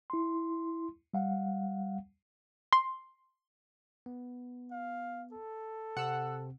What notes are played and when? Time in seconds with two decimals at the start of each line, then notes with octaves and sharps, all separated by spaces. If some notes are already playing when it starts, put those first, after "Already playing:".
0.10 E4 C6
1.14 G3 F5 F#5
2.73 C6
4.06 B3
4.71 F5
5.32 A4
5.97 C3 C4 F#5 E6